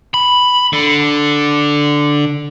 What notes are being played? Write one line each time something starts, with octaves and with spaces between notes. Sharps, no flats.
B5
D3